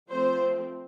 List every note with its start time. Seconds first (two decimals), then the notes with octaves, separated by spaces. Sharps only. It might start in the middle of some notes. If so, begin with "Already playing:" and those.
0.11 F3 A3 C4 C5